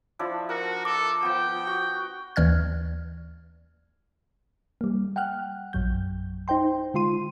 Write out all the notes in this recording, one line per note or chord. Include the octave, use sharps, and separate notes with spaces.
F3 D4 E4
F#4 A#4
A4 D6
F3 B3 G5
F#4
D#2 E3 D5 F6 G#6
G3 A#3
F#5 G5 F6 F#6
A#1 F#2 F#3 G6
D#4 C5 G5 C6
D3 G#3 F4 C6 D#7